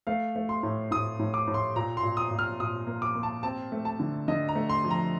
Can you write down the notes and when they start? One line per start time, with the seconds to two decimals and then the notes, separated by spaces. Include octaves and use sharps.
0.07 A3 F5
0.36 A3
0.49 C6
0.63 A2
0.91 A2 D#6
1.19 A2
1.34 D6
1.47 A2
1.54 C6
1.76 A#2 A#5
1.97 C6
2.03 A#2
2.17 D#6
2.31 A#2
2.39 F6
2.60 A#2 D#6
2.87 A#3
3.02 D6
3.15 A#3
3.23 A5
3.43 C4 A5
3.72 A3
3.85 A5
4.00 D3
4.28 D3 D#5
4.49 A#5
4.55 A3
4.70 C6
4.84 F2
4.91 A#5